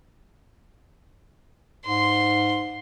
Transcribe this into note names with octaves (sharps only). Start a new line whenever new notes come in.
G#2 C6